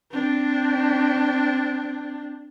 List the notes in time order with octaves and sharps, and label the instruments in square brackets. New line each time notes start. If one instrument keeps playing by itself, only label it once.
[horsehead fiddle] C4 D4